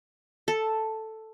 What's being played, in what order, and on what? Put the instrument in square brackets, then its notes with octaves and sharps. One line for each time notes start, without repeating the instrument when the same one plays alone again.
[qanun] A4